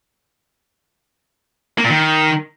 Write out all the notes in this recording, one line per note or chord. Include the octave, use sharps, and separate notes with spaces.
A#3
A#2
D#3